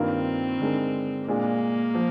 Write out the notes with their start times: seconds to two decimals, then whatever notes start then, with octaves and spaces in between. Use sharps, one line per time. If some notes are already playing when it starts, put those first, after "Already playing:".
Already playing: G2 D#3 A#3 C4 F4 A#4
0.60 D3 G#3 D#4 A#4
1.28 A#2 G#3 A#3 D4
1.95 F3